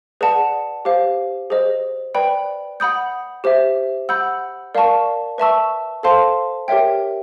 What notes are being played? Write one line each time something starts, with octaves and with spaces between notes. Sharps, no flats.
G#4 B4 D5 F#5 A5
G4 C5 F5
G#4 C5 D#5
B4 D5 G5 B5
F#5 B5 D#6 G6
G4 C5 E5
F#5 B5 E6 G6
A#4 D5 F5 A5 C#6
B4 E5 A5 C#6 E6
A4 C5 F5 A5 C6
G4 A#4 C#5 E5 G5